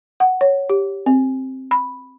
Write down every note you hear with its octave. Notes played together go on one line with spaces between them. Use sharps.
F#5
C#5
G4
C4
B5